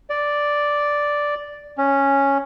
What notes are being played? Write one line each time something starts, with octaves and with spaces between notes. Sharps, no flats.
D5
C#4